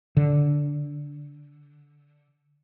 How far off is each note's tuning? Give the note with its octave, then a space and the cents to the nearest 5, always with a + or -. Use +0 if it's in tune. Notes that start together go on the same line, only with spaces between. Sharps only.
D3 -10